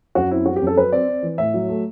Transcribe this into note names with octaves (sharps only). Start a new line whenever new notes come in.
F#2 F#4
C4 E4
F#3 F#4
G4
F#2
A4
F#3 B4
C4 D5
C4
E3
A2 E5
F#3
A3